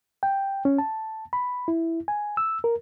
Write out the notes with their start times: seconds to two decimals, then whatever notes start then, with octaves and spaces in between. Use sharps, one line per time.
0.23 G5
0.65 C#4
0.78 A5
1.33 B5
1.68 E4
2.08 G#5
2.37 E6
2.64 A#4